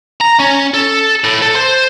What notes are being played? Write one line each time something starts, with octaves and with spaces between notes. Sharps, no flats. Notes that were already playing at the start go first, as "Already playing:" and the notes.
A#5
C#4
A4
A2
A4
C5